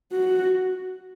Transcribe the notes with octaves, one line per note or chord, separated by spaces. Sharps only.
F#4